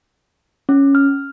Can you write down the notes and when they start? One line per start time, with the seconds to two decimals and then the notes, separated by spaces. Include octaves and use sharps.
0.69 C#4
0.95 F6